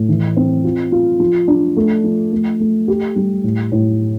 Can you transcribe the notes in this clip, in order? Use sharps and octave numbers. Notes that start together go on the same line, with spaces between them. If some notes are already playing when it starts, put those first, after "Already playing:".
Already playing: A2 A3
E3
C4
F4
F4
F3
D4
A3
F3
A3
A3
G4
G3
A2
A2